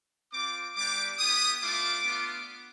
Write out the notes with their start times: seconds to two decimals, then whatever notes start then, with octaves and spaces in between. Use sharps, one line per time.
0.32 C4 F4 D6
0.75 G3 B3 D4 G4 D6
1.18 B3 E4 G4 D#6
1.61 A3 D4 F4 D6
2.04 B3 D4 F4